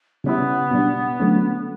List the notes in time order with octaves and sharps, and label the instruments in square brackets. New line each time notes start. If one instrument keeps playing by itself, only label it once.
[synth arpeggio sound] C#3 G3 C#4 E4 [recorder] B3
[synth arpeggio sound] B2 G3 D4
D3 F#3 A3 C#4